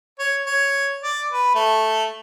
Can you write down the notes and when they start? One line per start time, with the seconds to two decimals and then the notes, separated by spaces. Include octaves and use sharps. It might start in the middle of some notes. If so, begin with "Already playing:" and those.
0.19 C#5
0.46 C#5
1.03 D5
1.33 B4
1.55 A3